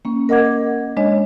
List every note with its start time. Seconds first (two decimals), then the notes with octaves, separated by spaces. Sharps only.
0.05 A#3 C#4
0.29 A#4 D#5 F#5 D6 G#6
0.97 G#3 D4 C#5 D#5